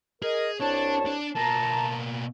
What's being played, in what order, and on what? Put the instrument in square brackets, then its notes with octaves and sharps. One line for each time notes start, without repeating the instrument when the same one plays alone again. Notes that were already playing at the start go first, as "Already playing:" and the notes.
[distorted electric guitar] G#4 [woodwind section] A#4 D#5
[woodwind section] C2 C#5 A5 [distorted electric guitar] D4
[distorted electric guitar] D4
[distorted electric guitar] B2 A#3 [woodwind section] A5 A#5